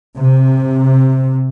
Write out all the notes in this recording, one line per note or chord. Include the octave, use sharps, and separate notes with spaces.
C3